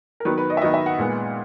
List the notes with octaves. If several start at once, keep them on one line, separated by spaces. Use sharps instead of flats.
A#4
D#3 F#3 B3 B4
B4
D#5
E5
D#3 F#3 B3 D#5
E5
F#5
A#2 G#3 B3